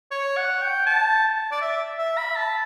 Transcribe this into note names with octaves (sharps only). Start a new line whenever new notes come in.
C#5
F#5
G5
A5
D5
E5
E5
B5
A5